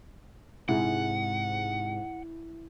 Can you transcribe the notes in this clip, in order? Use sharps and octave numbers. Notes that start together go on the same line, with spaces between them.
G#2 C3 E4 G#4 F#5